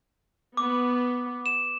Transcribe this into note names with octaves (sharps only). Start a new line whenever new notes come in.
B3 D6
E7